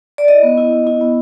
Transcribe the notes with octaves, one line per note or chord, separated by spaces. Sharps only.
D5
E4 D#5
B3
E4
B3
E4
B3